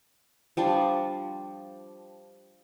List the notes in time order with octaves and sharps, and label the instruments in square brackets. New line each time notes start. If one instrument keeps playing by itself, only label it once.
[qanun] F3 G3 D4 C6